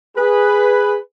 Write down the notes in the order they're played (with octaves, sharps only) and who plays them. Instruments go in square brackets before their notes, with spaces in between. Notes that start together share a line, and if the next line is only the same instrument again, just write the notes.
[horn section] G#4 B4